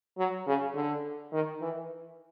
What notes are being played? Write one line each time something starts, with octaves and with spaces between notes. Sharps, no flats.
F#3
C#3
D3
D#3
E3